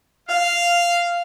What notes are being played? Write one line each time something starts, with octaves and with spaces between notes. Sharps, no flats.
F5